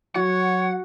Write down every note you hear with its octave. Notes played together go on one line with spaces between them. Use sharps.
F#3 F#4 C#5 F#5